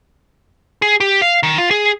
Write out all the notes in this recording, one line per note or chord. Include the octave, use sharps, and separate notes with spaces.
G#4
G4
F5
D#3
F4
G#4